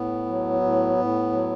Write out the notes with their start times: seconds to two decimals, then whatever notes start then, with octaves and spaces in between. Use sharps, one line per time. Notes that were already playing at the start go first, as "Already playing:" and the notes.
Already playing: A2 B3
0.26 F#3
0.61 A2
0.97 A2
1.32 F#3